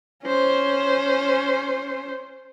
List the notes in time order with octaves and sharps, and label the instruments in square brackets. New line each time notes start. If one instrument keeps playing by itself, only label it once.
[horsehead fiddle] C#4 C5